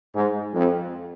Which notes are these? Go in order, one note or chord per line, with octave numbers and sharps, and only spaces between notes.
G#2
F2